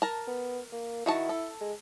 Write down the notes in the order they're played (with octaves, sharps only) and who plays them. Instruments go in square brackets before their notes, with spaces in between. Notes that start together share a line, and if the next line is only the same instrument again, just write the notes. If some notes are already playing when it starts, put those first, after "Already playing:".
[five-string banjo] A#4 A5
[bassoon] B3
A#3
[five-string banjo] D#3 F#4 A5 [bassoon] E4
[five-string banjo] A4
[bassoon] G#3